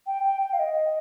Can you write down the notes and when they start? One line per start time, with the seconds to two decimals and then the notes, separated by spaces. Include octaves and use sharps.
0.07 G5
0.24 G5
0.42 G5
0.53 F5
0.59 D#5